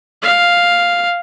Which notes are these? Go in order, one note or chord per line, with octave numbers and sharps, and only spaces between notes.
F5